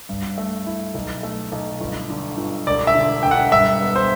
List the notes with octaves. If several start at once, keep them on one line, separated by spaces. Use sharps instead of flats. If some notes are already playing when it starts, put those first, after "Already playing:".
G2
A3
E4
B1
A3
B1
G1
D3
G1
E1 D5
E5
D3
E1 G5
F#5
G2 E5
B3
C5